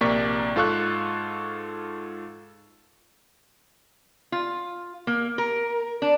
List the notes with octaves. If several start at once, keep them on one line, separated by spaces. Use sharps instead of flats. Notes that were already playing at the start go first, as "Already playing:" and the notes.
A#1 C3 A#3 D5 C#6 B6
G#2 F4 A4 F5 C#6 F#6
F4
A#3
A#4
D4